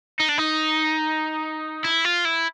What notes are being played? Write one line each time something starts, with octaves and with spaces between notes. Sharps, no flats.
D#4
D4
D#4
E4
F4
E4